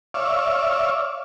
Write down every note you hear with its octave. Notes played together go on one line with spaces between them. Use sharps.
C#5 D5 E5 F5